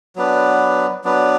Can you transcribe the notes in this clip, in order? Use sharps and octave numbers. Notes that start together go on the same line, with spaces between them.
F#3 B3 D4 B4
F#3 B3 D4 B4